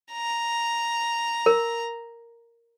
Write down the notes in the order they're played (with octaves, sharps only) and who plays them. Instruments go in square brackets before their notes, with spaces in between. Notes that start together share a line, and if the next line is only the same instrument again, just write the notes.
[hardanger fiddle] A#5
[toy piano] A#4